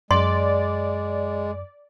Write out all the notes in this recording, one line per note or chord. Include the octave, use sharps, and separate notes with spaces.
F#2 G#3 D5 C6